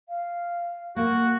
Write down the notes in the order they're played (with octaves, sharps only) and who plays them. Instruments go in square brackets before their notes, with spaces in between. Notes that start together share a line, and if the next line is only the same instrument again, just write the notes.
[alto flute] F5
[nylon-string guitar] A#3 [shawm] F#4